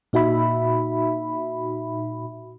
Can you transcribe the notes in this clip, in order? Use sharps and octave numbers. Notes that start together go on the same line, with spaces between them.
A#2 D#4 F#4 E5 B5